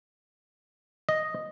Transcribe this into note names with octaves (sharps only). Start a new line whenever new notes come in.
D#5